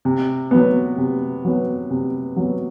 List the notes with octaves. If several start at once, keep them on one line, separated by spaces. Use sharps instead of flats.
C3
F#3 B3
C3
F#3 B3
C3
F#3 B3